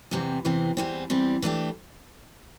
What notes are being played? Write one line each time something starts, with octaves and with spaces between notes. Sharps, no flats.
E2 C3 E3 C4
E2 C3 E3 C4
E2 E3 G3 C4
E2 E3 G3 C4
E3 A3 D4 G4